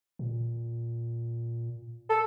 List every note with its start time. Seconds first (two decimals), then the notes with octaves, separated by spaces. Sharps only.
0.19 A#2
2.09 A4